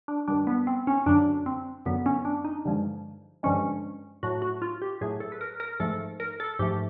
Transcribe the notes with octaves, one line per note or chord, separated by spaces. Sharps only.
D4
G2 D#3 G3 D4
B3
C4
C#4
F#2 D3 F#3 D4
C4
F#2 D3 F#3 B3
C#4
D4
D#4
G2 D3 F3 G#3
G2 D3 F3 G#3 C#4
A2 F#3 A3 F#4
F#4
F4
G4
A2 F#3 A3 G#4
A4
B4
A#4
A#4
G#2 F3 A3 A4
A#4
A4
G#2 F3 A3 G4